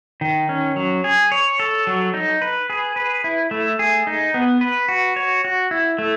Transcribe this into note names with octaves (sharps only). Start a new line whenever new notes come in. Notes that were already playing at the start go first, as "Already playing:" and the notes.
D#3
C#4
F#3
G#4
C#5
A4
F#3
D#4
B4
G#4
B4
E4
A3
G#4
D#4
B3
B4
F#4
C#5
F#4
E4
A3